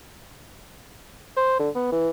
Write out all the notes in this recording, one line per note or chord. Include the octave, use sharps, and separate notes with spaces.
C5
D3
B3
E3